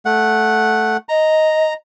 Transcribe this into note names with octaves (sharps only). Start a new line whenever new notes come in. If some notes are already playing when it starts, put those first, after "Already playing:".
A3 F#5
D#5 A#5